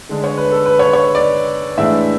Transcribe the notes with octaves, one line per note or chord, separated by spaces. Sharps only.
D3 G#3 D4
C#5
B4
A4
B4
C#5
C#5
D5
A2 E3 G#3 D4 E5